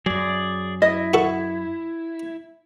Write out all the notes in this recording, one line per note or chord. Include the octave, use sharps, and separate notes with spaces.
F#2 F#3 G#4 D5
E4 D#5
F#4 A4